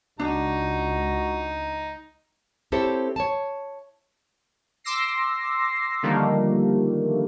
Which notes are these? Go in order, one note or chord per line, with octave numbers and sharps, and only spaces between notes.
C#2 D4 D#4 F#4 A#5
C4 E4 G4 A4 C5 C#5
C#5 A5
C6 D6 E6 A#6 C7
D3 D#3 F3 G3 A3 A#3